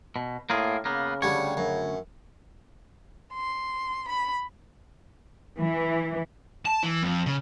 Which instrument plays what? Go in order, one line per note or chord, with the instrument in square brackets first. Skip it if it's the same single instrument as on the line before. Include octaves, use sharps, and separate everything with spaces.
[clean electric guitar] B2
[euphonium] A2 [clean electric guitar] A#3 F4 G#4
[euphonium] C#3 [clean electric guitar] A#3 B3
[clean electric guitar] D2 C#5 [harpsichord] D3 G3
[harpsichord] F#2
[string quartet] C6
B5
[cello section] E3
[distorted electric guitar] A5
E3
F2
C#3